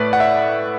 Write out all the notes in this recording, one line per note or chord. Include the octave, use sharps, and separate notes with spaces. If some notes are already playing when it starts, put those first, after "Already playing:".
Already playing: A2 A3 B4 D5
F#5
E5